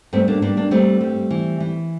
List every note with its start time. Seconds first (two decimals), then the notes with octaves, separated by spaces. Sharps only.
0.13 G2 A3 C4
0.28 A#3 D4
0.42 G2 A#3 D4
0.57 A#3 D4
0.71 G3 A3 C4
1.01 G3
1.30 E3
1.60 E3